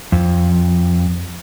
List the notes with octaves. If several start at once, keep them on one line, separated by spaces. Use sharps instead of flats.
F2